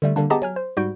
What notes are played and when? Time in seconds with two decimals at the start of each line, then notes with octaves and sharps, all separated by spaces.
0.02 D3 G3 A3
0.16 D3 G3 A#3 D4
0.30 B3 G4 G#4 D#5 A5 A#5
0.42 F#3 G#5 F6
0.56 C5
0.77 G#2 G3 F#4 G6 D7